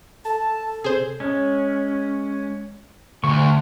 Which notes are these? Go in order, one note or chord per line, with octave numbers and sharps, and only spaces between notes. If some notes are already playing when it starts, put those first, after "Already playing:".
A4 A5
C3 G#4 C5
G#3 C#4
D2 C6 C#6